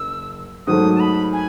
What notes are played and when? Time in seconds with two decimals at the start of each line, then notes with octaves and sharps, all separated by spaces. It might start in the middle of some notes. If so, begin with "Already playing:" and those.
Already playing: F#1 E6
0.67 G#2 D#3 F#3 A3 D#6
0.95 A5
1.00 B5
1.33 G#5